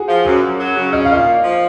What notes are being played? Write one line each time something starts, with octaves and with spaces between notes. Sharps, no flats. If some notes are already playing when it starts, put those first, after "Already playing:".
Already playing: F#4 G#4
F3
F#2 F#4
F#2
F#3
C#3
C#4 D#5
F5
A#2 D#5 F5
A#3
F3